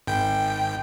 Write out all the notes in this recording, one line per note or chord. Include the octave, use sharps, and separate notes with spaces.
G#1 G5